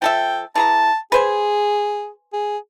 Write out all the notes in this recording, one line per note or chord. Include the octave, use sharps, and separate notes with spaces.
F3 A4 E5 G5
E3 G#4 A5 A#5
G#4 B4 C5 G#5
G#4